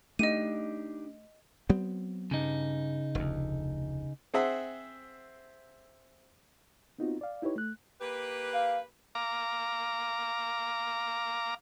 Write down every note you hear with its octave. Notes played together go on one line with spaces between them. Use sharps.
A3 D4 D#4 G4 D#5 D#7
F#3 B3 C4
G2 C#3 D#4
F1 D2
C4 G#4 C5 E5 F#5
B3 C4 D#4 F4 F#4
D5 F5
D#4 E4 G4 B4 C#5
A3 F#6
A#3 G4 B4
F5
F5 A#5 D6